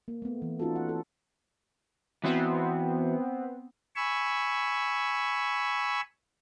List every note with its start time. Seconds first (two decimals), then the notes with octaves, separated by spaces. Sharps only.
0.08 A#3
0.22 A3 B3
0.42 E3
0.59 C#4 D#4 F4 F#4 A4
0.76 F#5
0.89 A4
2.24 E3 B3 C4 F#4
3.96 G#5 B5 C#6 E6